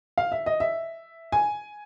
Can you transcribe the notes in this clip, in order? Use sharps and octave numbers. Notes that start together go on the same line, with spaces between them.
F5
E5
D#5
E5
G#5